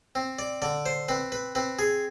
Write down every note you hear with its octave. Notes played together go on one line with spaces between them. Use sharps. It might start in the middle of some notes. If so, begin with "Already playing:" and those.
C4
D5
D3 D5
C5
C4 B4
B4
C4 B4
G#4